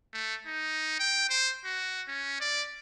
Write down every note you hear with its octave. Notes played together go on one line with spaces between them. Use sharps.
A3
D#4
G5
C5
F#4
C#4
D5